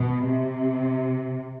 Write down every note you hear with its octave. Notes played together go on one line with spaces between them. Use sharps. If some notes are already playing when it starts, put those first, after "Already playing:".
Already playing: B2
C3